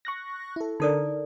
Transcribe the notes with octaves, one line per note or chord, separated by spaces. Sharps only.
C#6 F#6 A#6
E4 A4
D3 D#4 A4 A#4 D5